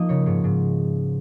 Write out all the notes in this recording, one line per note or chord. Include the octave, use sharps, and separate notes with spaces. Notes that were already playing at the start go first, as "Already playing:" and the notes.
Already playing: F3 A#3 D#4 D#5
C#3 C#5
G#2 C#5
G#2